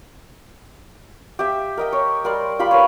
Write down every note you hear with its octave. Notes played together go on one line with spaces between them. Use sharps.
G4 E5
A#4 D#5 G5
C#5
G3 A#4 D5 C6
F4 G4 B5 C6
A#4 B4 C#5